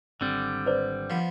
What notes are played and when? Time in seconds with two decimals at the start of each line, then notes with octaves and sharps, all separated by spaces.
0.21 G#1 D3 G3 C4
0.66 B4 C5 D5
1.10 F3 B3